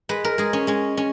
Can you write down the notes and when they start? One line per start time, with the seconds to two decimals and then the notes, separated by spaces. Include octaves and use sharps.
0.09 G#3 B4
0.25 A#4
0.38 G#3 G#4
0.53 C#4
0.67 G#3 C#4
0.97 C#4